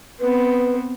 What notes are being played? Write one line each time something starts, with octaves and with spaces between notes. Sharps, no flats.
B3 C4 B4